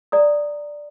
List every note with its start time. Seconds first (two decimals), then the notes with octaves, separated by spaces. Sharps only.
0.12 D5 A#5 D#6